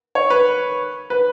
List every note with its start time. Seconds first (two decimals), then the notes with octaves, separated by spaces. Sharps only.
0.15 C#5
0.30 B4
1.10 B4